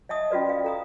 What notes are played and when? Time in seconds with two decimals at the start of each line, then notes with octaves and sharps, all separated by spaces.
0.09 D#5 E5 A5 D#6
0.31 C#4 F4 F#4 B4 D5
0.49 F5
0.64 A4 A#5 D#6